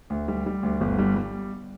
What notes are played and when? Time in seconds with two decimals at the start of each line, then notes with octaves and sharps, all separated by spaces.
0.10 D2
0.28 G3
0.46 G3
0.63 D2
0.81 G1
0.99 G3
1.16 G3